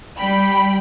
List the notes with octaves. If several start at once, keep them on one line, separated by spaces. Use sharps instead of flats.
G3 G5 B5